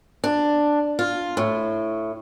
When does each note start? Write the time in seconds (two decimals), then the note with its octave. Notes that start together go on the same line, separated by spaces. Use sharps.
0.24 D4
0.99 F4
1.37 A2